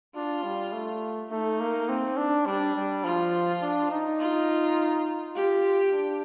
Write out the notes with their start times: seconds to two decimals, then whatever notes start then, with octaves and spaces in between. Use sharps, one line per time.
0.15 D4 F4
0.44 G3
0.73 A3
1.31 A3 D#4
1.60 A#3
1.89 C4
2.17 D4
2.46 G3 D4
2.76 G3
3.04 F3 F4
3.62 D4
3.91 D#4
4.20 F4
5.35 F4 G4
5.93 D4